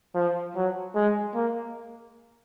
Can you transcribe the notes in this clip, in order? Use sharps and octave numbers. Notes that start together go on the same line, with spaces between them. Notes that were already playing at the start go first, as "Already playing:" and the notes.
F3
F#3
G#3
A#3